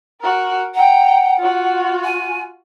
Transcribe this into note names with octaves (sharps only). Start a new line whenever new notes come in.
F#4 A#4
F#5 G5 A#5
F4 F#4
G#5